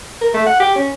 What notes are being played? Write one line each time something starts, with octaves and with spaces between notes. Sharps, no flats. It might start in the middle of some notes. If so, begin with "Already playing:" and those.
A#4
A3
F#5
G4
C#4